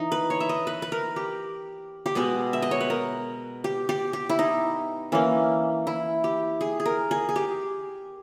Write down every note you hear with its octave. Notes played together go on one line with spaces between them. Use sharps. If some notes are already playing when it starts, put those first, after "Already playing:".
Already playing: E3 D#4
B4
C#5
E5
D#5
B4
B4
A#4
G4
G4
B2 G#3 B3 G#4
E5
D#5
C#5
B4
A#4
G4
G4
G4
E4
D#4
E3 A#3 C#4
E4
G4
G#4
G#4
A#4
G#4
G#4
G4